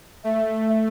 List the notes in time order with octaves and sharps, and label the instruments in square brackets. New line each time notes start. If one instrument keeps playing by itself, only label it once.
[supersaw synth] A3 [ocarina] E5